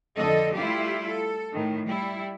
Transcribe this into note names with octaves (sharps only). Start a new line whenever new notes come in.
F2 D3 A4 D#5
G3 A3 E4 F4 G4
A4
A2 D#3
G3 E4